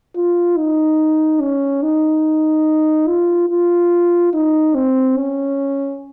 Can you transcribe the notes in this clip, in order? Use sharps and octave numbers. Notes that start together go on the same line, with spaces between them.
F4
D#4
C#4
D#4
F4
F4
D#4
C4
C#4